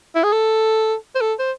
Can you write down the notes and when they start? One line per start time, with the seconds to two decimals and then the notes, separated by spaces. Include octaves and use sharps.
0.15 E4
0.24 G#4
0.32 A4
1.15 C5
1.21 A4
1.39 C5